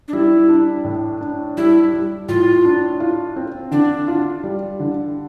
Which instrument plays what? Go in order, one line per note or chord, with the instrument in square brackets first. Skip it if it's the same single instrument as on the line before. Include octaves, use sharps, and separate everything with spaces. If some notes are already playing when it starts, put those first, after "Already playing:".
[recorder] D4
[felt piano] G3 [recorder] E4
[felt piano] D4
A2
D4
[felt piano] G3 [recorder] E4
[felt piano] G3
[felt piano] A2 [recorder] F4
[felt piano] D4
F4
C4
[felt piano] D3 [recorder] D4
[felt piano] F4
G3
D3